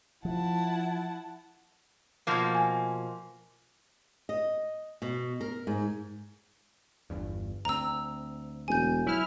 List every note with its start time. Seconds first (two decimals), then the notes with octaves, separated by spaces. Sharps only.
0.25 F3 E4 F#5 A5
2.27 B2 F3 A#3
2.55 G#5
4.29 D#5
5.02 B2
5.41 A#4
5.67 G#2
7.10 G1 E2 G2
7.65 D2 C4 A#5 E6
8.68 E1 G#5 G6
9.07 F#3 E4 F6